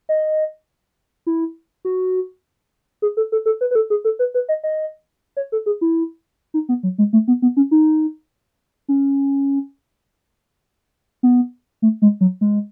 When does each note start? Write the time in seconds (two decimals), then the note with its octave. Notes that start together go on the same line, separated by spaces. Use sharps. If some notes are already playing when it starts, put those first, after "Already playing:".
0.09 D#5
1.27 E4
1.85 F#4
3.02 G#4
3.17 A4
3.32 A4
3.46 A4
3.61 B4
3.71 B4
3.75 A4
3.90 G#4
4.05 A4
4.19 B4
4.34 B4
4.49 D#5
4.64 D#5
5.37 C#5
5.52 A4
5.66 G#4
5.81 E4
6.54 D#4
6.69 B3
6.83 F#3
6.98 G#3
7.13 A3
7.28 B3
7.42 B3
7.57 C#4
7.71 D#4
8.88 C#4
11.23 B3
11.82 A3
12.02 G#3
12.21 F#3
12.41 G#3